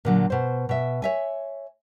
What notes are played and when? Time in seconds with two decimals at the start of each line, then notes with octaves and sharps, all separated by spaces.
0.05 A#2 D3 F#3
0.30 B2 C5
0.69 B2 E5
1.02 C#5 E5 G#5